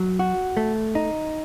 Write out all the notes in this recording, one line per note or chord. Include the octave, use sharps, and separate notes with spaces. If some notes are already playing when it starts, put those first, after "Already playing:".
Already playing: F#3
F#4
A3
D#4